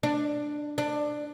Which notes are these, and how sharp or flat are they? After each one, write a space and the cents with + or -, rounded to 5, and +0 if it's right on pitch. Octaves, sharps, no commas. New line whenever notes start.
D4 +10
D4 +15